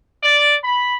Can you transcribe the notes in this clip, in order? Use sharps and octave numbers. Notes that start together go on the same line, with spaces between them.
D5
B5